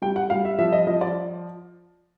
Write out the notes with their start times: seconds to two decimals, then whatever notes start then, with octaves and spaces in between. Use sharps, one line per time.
0.02 G3 G5
0.16 F#5
0.30 G3 F5
0.45 E5
0.59 F3 E5
0.72 D#5
0.87 F3 D#5
1.01 D5